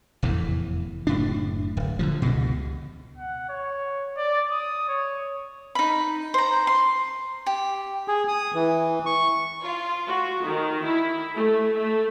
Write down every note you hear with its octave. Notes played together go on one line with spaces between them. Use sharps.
F1 E2 A2 E3
F#1 A2 D4
D1
D3 E3 F3
C#2 G2 B2
F#5
C#5
D5
D#6
C#5
D#4 B5
C5 A#5
C6
G4
G#4
D#6
E3
C#6
F4
F#4
D#3
E4
A3
A3